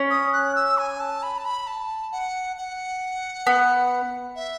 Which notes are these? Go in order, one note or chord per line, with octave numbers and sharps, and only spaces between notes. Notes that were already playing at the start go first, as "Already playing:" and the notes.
Already playing: C#4
D#6
F#6
E6
G#5
A5
B5
A5
B5
A5
F#5
F#5
B3
E5